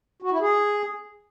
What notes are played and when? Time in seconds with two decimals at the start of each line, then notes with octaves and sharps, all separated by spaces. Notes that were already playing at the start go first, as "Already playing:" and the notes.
0.22 F#4
0.31 E4
0.41 G#4